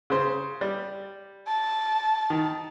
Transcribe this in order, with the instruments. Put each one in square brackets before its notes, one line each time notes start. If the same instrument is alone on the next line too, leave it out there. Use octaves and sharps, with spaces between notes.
[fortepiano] C#3 C5
G3
[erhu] A5
[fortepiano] D#3